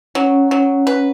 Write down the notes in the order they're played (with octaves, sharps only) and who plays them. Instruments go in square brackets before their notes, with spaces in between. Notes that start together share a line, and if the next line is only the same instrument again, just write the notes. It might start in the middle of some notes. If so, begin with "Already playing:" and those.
[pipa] F#3 [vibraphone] C#4
[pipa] F#3
B4